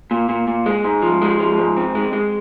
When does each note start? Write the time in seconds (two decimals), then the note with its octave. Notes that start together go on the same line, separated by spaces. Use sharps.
0.11 A#2
0.29 A#2
0.48 A#2
0.66 G#3
0.84 G#2
1.02 F3
1.22 G#3
1.40 F3
1.59 G#2
1.77 C4
1.95 G#3
2.13 G#3